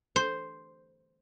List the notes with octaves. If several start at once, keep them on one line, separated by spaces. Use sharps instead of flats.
C5